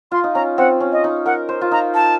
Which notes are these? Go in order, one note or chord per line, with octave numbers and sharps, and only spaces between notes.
F4 C6
D#4
C#4 A#5
C4 F#5
C#4
D#5
D#4
A#4 F#5
C5
F4
D#4 A#5
A5